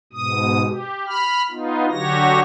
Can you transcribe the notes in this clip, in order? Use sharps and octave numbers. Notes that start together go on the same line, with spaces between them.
G#2 B2 D#6
G4
B5 F6
B3 D#4 F4
D3 F#3 F#4 G4 C#5 A#6